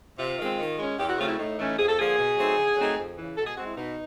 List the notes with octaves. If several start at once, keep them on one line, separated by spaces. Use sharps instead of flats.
C3 F4
D#3 G#3 C4
D#3
G#3 C#4
E2 G4
F#4
C#3 F#3 A3 C4 F4
E4
A2 D#4
E3 A3 C#4
F2 G#4
A4
D3 F3 A#3 G#4
B2
F#3 A3 C4 D#4
D3
F#3 A3 C4 D#4
F2
C#3 E3
B2 A4
G#4
G#3 C4 F#4
E4
B2 D#4